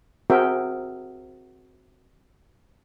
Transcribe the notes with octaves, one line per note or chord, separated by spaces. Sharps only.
C4 F#4 G#4 A#4 E5 G5